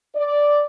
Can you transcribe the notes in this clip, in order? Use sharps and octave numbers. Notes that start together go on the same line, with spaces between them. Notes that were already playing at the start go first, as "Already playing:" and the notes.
D5